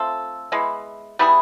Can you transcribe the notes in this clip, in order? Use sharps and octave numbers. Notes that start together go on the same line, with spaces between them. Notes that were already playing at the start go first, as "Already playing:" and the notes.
Already playing: A3 C4 F4 A4
G#3 B3 E4
G3 B3 E4 G#4